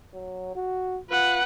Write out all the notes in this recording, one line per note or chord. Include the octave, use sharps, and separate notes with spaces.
F#3
F#4
F4 B4 F#5